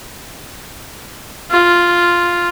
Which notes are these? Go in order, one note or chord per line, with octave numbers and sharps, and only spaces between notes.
F4